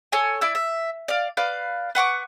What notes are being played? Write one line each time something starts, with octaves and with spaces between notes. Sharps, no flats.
A4 C#5 G#5
E4 D5 E6
E5
D5 F5
B4 D5 F5 F6
B4 F#5 C#6 D6